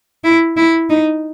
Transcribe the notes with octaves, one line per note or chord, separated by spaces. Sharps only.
E4
E4
D#4